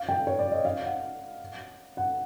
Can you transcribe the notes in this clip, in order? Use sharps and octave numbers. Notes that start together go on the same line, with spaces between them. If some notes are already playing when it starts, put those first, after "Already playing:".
Already playing: F5
G5
C#5
D5
D#5
F5
F#5
F#5